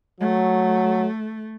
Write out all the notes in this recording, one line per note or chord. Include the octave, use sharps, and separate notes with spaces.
F#3 A3